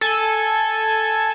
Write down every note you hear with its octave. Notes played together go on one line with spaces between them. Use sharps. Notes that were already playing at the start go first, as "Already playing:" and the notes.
A4 G#5